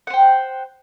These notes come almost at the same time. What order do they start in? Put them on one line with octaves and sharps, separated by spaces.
F#5 C5 G5